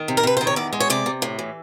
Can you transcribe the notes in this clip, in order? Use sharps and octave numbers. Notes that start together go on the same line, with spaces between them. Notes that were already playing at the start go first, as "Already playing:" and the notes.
Already playing: D#3
C3
A#4
C3 B4
D#3 C5
C#5
E2 D5
G#3
C#5
C3 D5
C3
A2
E3